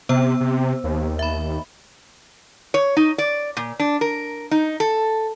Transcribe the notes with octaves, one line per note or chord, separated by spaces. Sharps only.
C3 B3 C5 E6
C3
D#2
E5 B5
C#5
D#4
D5
A#2
D4
A#4
D#4
A4